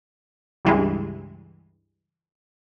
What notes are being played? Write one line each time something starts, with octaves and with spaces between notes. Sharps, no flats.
C#2 G2 E3 G3 G#3